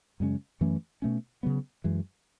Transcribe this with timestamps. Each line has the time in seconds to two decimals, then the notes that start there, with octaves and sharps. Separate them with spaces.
0.20 F#2 C#3 G#3 C#4
0.61 F#2 E3 A3 C#4
1.02 B2 A3 C#4
1.43 C#3 F#3 B3
1.84 F#2 E3 G#3